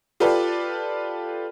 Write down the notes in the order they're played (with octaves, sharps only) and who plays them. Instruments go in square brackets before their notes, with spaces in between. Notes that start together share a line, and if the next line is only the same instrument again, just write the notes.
[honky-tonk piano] F4 G4 A4 B4 D5